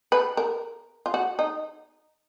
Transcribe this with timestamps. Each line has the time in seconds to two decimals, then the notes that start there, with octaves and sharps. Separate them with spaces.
0.12 B4
0.37 A#4
1.06 F4
1.14 F#4
1.39 D#4